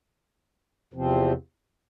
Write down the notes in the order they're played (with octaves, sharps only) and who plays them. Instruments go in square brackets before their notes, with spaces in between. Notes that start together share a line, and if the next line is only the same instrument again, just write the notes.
[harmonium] E2 C3 F3 C4